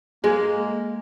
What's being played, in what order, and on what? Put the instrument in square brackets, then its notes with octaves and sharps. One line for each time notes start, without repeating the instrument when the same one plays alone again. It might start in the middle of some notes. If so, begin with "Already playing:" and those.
[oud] G#3 [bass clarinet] A#3